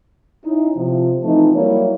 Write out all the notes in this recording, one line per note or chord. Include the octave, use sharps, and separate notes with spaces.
C#4 D#4 E4
C3 F3
E3 F3 A3 C4 D#4
F#3 G3 A#3 E4 C#5